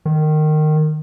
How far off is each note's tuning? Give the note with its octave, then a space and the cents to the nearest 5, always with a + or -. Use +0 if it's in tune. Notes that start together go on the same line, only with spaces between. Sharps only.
D#3 -20